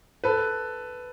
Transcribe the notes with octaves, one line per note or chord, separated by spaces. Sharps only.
A4 B4